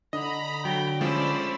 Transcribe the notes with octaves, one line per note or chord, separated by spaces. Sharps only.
D3 D#5 A#5 B5
F#3 G5
F3 G#3 A3 C#4 C5 D5 B5 E6